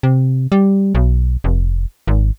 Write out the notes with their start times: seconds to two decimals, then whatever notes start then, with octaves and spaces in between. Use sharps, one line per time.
0.03 C3
0.52 G3
0.95 B1
1.44 F1
2.07 G#1